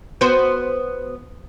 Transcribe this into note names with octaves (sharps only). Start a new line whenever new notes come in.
B3 F#4 C5